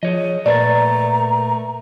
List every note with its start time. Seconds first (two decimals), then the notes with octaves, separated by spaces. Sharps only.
0.03 F3 G#4 C#5 D#5
0.46 A#2 A3 A#4 B4 D5 A#5 A6